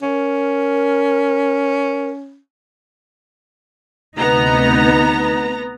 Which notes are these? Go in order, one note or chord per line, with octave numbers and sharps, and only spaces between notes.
C#4 A#4
D2 C3 B3 D#4 A#5